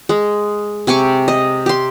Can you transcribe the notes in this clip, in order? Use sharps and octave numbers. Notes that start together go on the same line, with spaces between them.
G#3
C3 G#5 C#6 D6
D#5
G4 C6